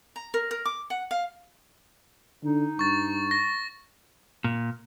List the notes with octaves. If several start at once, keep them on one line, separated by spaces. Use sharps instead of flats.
A#5
A#4
A#4
D6
F#5
F5
D3 D#4
G2 C#6 A6
A#6
A#2